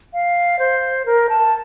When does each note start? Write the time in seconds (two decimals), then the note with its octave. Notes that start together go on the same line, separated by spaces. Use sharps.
0.13 F5
0.59 C5
1.06 A#4
1.29 A5